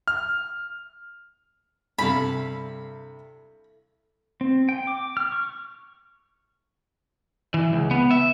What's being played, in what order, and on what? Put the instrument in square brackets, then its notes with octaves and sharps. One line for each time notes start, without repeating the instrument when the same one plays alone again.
[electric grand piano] F6
[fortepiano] G2 C3 [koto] E4 A4 F5 [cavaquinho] B5
[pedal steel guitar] C4
G5
D6
F6
C#6
[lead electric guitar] E3
C#2
B3
E5